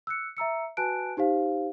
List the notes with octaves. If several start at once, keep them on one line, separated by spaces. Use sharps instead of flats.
E6 F#6 C#7
E5 A#5 E6 C#7
F#4 B4 G#5 A5 F#6 D7
D#4 G4 C5 F5